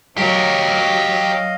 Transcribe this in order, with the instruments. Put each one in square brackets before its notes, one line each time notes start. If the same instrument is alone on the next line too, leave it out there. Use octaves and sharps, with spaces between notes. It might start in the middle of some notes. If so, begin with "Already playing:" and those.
[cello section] F#3 [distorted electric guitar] G4 A#4 [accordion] D#5 F5